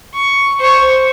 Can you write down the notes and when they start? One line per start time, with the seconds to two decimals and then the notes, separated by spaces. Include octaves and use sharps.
0.14 C#6
0.59 C5 C#6